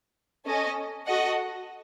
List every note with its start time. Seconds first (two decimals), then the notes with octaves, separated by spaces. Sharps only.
0.45 C#4 A4 D#5
1.06 F#4 A4 D#5 F#5